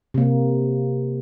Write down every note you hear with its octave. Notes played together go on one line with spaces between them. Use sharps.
C3 A#3